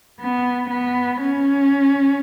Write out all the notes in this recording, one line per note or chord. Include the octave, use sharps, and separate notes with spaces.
B3
B3
C#4